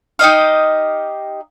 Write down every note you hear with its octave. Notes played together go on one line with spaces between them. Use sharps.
D#4 G4 D#5 F5